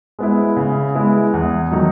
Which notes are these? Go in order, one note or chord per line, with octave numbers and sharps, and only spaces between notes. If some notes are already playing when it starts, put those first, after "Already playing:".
G#3 B3 E4
C#3
G#3 B3 E4
E2
D#3 F#3 A3 D#4